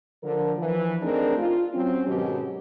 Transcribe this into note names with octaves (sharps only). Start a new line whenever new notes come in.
D3 F3 A#4
E3 F3
A3 C4 D4 D#4 G#4 A#4
F4
F#3 C4 C#4
G#2 B2 D#3 F#3 C#4 G4